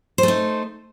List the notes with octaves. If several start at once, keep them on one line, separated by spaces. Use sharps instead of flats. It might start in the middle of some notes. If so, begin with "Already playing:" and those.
A3 D#4 C5